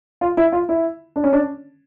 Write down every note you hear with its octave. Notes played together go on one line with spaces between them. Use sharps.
F4
E4
F4
E4
D4
C#4
D4